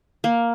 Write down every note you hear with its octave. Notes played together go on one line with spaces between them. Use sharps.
A#3